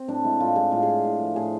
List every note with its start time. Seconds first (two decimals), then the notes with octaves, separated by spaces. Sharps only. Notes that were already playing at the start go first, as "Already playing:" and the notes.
Already playing: C4
0.08 A2 D4
0.24 G#3 E4
0.40 A2 F4
0.56 G#3 G#4
0.72 A2 F4
0.83 G#4
0.88 G#3
1.05 A2
1.19 F3 A3
1.35 A2 G#4